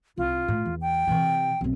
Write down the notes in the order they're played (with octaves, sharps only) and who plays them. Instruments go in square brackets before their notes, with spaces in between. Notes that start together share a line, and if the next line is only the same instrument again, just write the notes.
[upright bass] C2 [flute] F4
[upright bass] A2
E2
[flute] G5
[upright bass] C3 E3
B1 C4